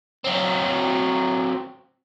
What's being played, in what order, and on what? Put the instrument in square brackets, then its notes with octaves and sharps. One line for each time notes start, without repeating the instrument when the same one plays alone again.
[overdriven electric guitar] F#3 C4